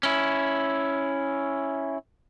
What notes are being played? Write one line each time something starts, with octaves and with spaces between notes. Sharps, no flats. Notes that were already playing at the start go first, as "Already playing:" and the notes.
C#4 E4